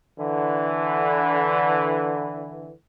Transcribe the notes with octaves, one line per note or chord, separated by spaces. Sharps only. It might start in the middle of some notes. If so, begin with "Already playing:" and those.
D3 E3